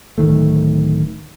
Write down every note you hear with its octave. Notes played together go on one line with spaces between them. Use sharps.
D1 B1 D#3 A3